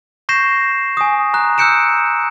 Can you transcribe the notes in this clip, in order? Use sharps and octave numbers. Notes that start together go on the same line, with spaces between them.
C#6 G6 A#6 C7 E7
G#5 D#6
A#5 F#6
E6 F#6 G6 C#7 D7 E7